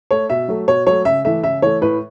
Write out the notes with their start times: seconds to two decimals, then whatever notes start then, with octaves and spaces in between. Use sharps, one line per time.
0.11 A3 C#5
0.30 B2 E5
0.48 F#3 A3
0.68 B2 C#5
0.87 F#3 A3 C#5
1.05 C#3 E5
1.25 E3 A3 E5
1.43 C#3 E5
1.62 E3 A3 C#5
1.81 A2 B4